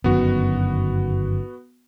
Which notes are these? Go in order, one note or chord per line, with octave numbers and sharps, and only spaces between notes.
G1 F#2 D#3 B3 F#4